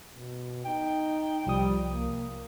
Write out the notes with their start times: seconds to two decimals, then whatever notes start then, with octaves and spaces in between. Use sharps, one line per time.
0.15 B2
0.65 D#4 G5
1.46 C2 F3 G3 D#6
1.91 A#3